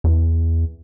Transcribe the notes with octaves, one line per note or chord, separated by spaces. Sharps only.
E2